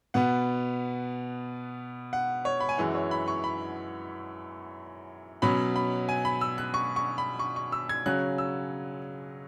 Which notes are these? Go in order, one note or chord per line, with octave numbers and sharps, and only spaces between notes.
B2 B3 F#5
F#5
C#5
B5
G#5
F#2 E3 G#3 F#5
C#5
B5
C#6
B5
B2 F#3 C#4 B5
B5
G#5
B5
E6
F#6
C#6
C#6
B5
C#6
C#6
E6
G#6
C#3 F#3 C#4 F#6
E6